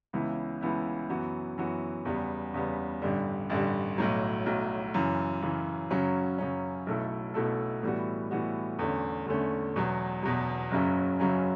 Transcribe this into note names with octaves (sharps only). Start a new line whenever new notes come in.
C#2 C#3 E3 B3 E4
C#2 C#3 E3 B3 E4
F#2 E3 B3 F#4
F#2 E3 B3 F#4
E2 C#3 G3 B3
E2 C#3 G3 B3
A1 G2 D3 G3
A1 G2 D3 G3
B1 A2 F#3
B1 A2 F#3
F#2 C#3 E3
F#2 C#3 E3
F#2 C#3 F#3 C#4
F#2 C#3 F#3 C#4
B1 B2 A3 E4 A4
B1 B2 A3 E4 A4
A2 E3 G3 B3 F#4
A2 E3 G3 B3 F#4
E2 D3 A3 C#4
E2 D3 A3 C#4
E2 B2 F#3
E2 B2 F#3
F#1 F#2 C#3 F#3 C#4
F#1 F#2 C#3 F#3 C#4